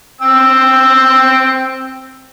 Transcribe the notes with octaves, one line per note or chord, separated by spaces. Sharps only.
C4 G5 E6